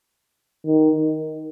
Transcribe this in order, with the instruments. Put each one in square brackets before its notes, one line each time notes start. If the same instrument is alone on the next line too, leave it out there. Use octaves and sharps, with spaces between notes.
[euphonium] D#3